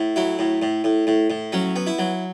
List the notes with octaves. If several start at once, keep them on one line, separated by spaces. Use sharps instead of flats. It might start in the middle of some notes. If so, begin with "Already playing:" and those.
Already playing: A2
F#3 E4
A2
A2
A2
A2
A2
F#3 C#4
B3
E4
F#3